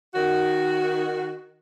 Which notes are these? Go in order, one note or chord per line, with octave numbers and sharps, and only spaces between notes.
D#3 F#4